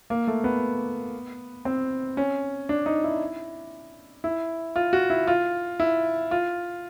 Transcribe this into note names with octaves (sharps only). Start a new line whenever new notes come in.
A#3
A3
B3
C4
C#4
D4
D#4
E4
E4
F4
F#4
E4
F4
E4
F4